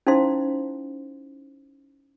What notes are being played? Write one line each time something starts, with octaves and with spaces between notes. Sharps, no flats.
C#4 D#4 E4 C5 F5 C6